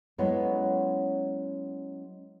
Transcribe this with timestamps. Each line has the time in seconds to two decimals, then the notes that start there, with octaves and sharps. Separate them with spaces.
0.18 F#3 G#3 B3 C#4 E4 A4